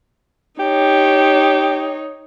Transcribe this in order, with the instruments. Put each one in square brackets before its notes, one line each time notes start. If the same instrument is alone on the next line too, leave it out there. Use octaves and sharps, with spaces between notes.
[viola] D#4 C#5 [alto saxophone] G4